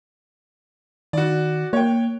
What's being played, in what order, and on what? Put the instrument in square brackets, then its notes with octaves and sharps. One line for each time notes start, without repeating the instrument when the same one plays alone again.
[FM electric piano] D#3 [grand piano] F#4 D5
[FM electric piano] A#3 [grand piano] C#5 G5